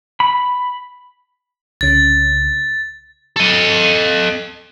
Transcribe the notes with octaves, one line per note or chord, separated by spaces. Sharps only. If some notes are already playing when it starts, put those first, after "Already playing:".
B5
C2 C#3 A6
A4 D#5